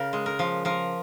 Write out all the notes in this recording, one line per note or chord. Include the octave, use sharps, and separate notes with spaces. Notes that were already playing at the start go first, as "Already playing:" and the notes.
Already playing: C#3 A#4
G#3
A#4
F3
F3 A#4